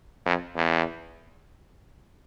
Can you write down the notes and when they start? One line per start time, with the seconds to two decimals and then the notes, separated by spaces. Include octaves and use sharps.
0.26 F2
0.56 E2